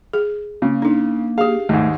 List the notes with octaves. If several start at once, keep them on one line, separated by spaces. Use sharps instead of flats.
G#4
C#3 A#3
D4 D#4
G4 G#4 F5
D#2 G#2 A3